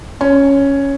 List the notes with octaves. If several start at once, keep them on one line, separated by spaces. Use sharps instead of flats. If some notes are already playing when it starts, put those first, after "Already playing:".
C#4